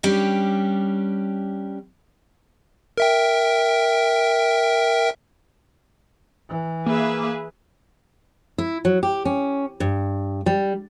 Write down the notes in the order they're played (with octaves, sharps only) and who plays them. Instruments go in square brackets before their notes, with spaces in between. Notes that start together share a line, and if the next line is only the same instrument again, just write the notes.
[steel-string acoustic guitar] G3 C#4 D4 G4
[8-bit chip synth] A#4 E5 G5
[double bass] E3
[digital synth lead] A#3 [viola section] G#4 B4 E5
[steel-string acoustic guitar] E4
F#3
G4
C#4
G2
G3